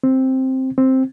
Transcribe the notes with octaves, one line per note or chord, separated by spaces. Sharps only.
C4
C4